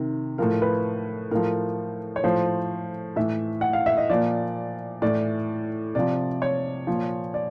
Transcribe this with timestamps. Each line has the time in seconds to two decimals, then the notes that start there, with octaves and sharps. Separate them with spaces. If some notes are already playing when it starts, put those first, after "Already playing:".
Already playing: C3 D#3
0.38 A2 F3 A#4
0.62 B4
1.31 A2 F3 A#4
2.16 C#5
2.24 A2 F3 C5
3.16 A2 E3 E5
3.61 F#5
3.73 F5
3.86 E5
3.97 D#5
4.10 A#2 F3 D5
5.02 A2 E3 D5
5.95 C3 F3 D5
6.42 C#5
6.87 A#2 F3
7.34 D5